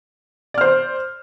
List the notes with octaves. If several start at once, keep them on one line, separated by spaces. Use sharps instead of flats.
C5 D5 F6